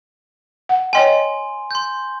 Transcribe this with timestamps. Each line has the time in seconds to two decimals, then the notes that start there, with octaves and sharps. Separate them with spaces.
0.69 F#5
0.93 C#5 D#5 G5 G#5 C6
1.71 C6 G6